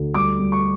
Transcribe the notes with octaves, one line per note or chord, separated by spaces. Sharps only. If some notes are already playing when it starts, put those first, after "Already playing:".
Already playing: D2
G3 D6
G3
C#6